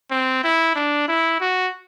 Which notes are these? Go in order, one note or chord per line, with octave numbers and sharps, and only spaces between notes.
C4
E4
D4
E4
F#4